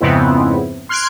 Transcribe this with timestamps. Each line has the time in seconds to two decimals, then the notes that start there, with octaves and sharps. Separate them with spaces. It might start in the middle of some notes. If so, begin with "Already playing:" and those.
0.01 F2 G#2 C#3 B3 C4 E4
0.89 C6 F6 F#6 G#6 C7 D7